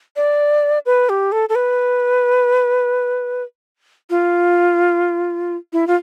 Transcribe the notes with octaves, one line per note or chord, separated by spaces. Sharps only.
D5
B4
G4
A4
A4
B4
F4
E4
F4